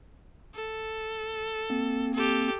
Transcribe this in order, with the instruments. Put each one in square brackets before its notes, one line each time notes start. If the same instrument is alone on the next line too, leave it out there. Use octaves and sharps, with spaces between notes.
[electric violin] A4
[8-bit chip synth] A#3 C4
[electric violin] G4 A4